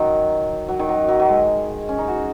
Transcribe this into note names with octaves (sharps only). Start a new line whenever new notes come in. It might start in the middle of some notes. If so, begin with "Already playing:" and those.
Already playing: D#3 F#3
F#3
D#3
F#3
F#3
F#3
G#3
C#4
D#4
F#4